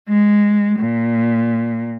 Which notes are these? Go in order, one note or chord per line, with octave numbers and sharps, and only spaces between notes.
G#3
A#2